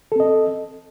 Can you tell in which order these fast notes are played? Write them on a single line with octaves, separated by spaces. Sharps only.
A4 C4 D#5